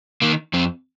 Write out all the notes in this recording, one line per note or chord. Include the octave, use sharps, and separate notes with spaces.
D#3 A#3
F2 C4